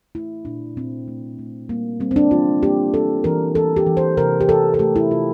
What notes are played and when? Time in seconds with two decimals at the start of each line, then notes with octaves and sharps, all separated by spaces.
0.15 A3 E4
0.45 A#2 D4
0.76 A#2 C4
1.08 A3
1.39 A3
1.69 G3 A#3
2.00 G3 C4
2.11 C4
2.16 D4
2.31 E3 F4
2.62 A#3 G4
2.94 E3 A4
3.24 E3 A#4
3.55 E3 A4
3.76 G4
3.86 E3
3.97 C5
4.17 C3 A#4
4.41 G4
4.49 E3 A4
4.74 A4
4.79 A3 G4
4.96 E4
5.11 C3 F4